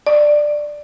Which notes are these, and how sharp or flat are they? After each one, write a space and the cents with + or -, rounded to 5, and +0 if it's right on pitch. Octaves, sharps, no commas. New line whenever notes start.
D5 +10